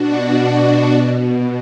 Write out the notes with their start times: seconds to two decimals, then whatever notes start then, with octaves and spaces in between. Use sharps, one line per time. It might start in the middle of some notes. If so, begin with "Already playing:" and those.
Already playing: B2 D4 F#4
0.36 D4 F#4
0.91 B2